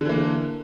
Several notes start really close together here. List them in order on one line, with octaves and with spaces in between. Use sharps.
D3 E3 A#3